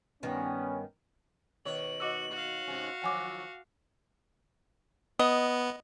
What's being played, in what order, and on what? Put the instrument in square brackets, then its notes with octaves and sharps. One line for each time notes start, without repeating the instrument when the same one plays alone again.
[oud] G2 D#3 G3 [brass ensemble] B3 C#4
[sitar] B2 D#3 C#5 [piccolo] F#7
[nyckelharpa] F#4 [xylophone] D#5 D6 E6
[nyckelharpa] F#4 F5
[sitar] G#2 C3 C#4
[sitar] D#3 F3 F#3 [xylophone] F#5 G#5 D6
[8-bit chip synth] B3 [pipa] D#5